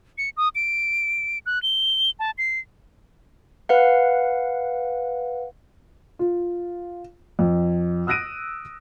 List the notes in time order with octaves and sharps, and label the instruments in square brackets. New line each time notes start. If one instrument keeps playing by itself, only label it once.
[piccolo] C#7
D#6
D7
F#6
G7
A5
C7
[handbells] B4 F5 F#5
[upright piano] F4
F2
D#6 E6 F#6 A#6 D7 D#7